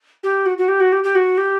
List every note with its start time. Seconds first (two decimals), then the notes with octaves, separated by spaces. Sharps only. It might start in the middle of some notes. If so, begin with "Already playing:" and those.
0.23 G4
0.46 F#4
0.58 F#4
0.68 G4
0.80 F#4
0.92 G4
1.04 G4
1.15 F#4
1.38 G4